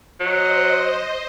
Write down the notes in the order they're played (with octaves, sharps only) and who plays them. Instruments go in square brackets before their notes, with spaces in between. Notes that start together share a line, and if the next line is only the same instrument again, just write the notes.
[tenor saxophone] F#3 [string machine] C5 D#5